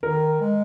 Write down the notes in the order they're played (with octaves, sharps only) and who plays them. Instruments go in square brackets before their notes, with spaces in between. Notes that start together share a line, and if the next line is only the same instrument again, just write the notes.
[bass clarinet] D#3 [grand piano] A#4
[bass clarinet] G#3